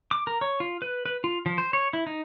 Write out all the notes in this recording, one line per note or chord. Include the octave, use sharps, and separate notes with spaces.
D6
A#4
C#5
F4
B4
B4
F4
F3
C5
C#5
E4
D#4